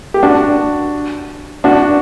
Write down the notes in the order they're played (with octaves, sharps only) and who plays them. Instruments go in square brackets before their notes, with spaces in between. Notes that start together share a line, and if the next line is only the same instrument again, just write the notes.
[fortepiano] G4
D4 F#4
D4 F#4